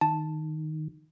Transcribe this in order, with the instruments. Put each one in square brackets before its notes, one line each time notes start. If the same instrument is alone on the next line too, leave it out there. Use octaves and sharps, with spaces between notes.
[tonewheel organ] D#3 [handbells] A5